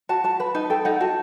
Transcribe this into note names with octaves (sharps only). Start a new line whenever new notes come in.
F#4 A5
F#4 A5
B4 B5
D#4 A5
A4 G5
D#4 F#5
F#4 A5